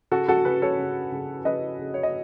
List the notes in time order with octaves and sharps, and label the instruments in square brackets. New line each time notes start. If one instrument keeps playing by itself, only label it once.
[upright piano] C#3 F#4 A4
F#4 A4
C#3 G#4 B4
A4 C#5
C#3
C#3
C#3 B4 D#5
C#3
C#5
D#5